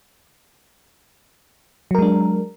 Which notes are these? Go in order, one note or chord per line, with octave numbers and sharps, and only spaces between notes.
F#3 G#3 D4 A#4